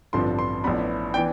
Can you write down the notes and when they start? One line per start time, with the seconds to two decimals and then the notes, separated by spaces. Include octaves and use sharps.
0.13 A1 G2 D3 F3 C4 C6
0.39 C6
0.64 A1 A2 F3 B3 D4 B5
1.14 E3 B3 D4 G5